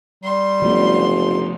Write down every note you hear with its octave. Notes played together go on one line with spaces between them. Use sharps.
G3 C6
F#1 F3 A3 B3